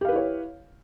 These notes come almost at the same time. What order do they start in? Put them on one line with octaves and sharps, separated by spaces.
G4 F5 B4 E4 C#5